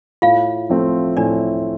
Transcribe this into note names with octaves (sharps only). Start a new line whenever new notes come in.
A2 F4 F5
F3 A3 C4 F4
A2 D4 D5